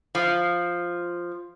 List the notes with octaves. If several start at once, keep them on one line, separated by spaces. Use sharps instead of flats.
F3